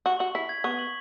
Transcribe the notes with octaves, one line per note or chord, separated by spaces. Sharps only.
F#4 C#6
F#4 F#7
E4 B6
G#6
B3 C#6
F#7